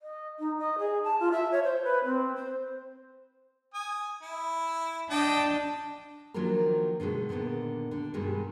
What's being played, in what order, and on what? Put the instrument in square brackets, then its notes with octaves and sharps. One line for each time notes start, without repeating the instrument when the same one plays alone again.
[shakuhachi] D#5
D#4
D#5
G#4
A5
F4
E5
C#5
C5
B4
C4
C5
[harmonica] G#5 D#6
E4
[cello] D4 [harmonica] D#5 G5 A5
[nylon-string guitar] D#3 F3 F#3 A#3 D4 A#4
B2 D3 D#3 G#3
A#2 D3 D#3 B3 D4
D3 D4
G2 B2 D#3 G3 G#3